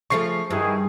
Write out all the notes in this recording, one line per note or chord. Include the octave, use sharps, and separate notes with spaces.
C#3 F3 A3 C#6 C7
G2 D#3 E4 G#4